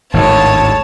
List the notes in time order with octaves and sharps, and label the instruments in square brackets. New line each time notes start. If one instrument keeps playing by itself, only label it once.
[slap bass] G#1 D2 A2 [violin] C#5 A5